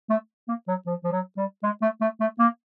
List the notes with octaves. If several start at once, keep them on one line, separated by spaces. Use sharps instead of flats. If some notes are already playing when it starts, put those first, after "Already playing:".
A3
A#3
F#3
F3
F3
F#3
G3
G#3
A3
A3
A3
A#3